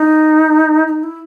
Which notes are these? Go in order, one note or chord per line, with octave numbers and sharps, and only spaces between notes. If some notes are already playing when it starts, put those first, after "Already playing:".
Already playing: D#4
D#4
E4